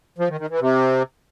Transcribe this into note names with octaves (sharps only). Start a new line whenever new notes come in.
F3
D#3
D#3
E3
C3